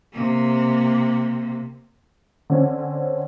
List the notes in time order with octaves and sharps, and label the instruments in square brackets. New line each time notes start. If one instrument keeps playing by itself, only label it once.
[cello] C3 A#3
[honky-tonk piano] D3 C4 C#4